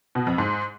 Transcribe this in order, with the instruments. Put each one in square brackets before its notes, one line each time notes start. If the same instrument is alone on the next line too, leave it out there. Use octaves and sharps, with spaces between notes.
[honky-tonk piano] B2
F2
G#2